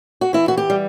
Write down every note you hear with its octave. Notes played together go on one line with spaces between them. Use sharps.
F#4
E3 E4
F#4
G4
G3